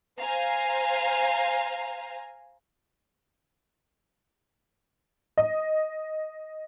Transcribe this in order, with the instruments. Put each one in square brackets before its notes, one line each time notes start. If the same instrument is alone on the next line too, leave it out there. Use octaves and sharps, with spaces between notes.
[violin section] C5 F5 G#5 A#5
[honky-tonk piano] D#5